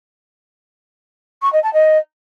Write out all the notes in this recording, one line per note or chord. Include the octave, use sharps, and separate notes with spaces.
C#6
D#5
A5
D#5